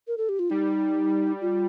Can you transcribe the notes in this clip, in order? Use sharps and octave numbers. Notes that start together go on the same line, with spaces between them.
A#4
A4
G4
F4
G3 D#4
F4